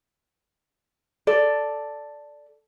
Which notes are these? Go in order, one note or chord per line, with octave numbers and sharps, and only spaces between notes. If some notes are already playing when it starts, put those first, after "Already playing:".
A4 D5